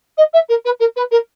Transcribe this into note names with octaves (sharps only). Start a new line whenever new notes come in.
D#5
E5
A#4
B4
A#4
B4
A#4